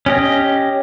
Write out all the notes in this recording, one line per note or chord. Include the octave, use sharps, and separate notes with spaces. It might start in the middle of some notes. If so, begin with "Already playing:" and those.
C#4 G4 D#5